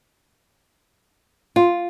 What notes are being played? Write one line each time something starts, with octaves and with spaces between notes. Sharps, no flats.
F4